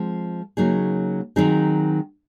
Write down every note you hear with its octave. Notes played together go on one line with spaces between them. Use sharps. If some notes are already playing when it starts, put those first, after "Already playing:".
Already playing: F3 G#3 C4
C#3 F#3 A#3 D#4 G#4
D#3 F#3 C4 D#4 G#4